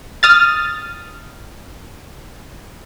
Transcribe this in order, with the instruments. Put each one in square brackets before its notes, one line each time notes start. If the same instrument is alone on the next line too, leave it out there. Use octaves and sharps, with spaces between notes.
[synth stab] D#6 F6 A6